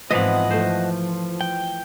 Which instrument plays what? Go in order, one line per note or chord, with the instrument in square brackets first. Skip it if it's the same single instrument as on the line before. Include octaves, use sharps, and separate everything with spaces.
[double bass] G#2 C4 [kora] E3 F3 B3 [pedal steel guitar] D#5 F#5
[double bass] F3 [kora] A3 C5
[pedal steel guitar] G5